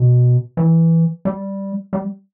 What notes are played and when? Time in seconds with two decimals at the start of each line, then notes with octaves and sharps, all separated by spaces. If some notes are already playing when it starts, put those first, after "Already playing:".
Already playing: B2
0.57 E3
1.25 G3
1.93 G3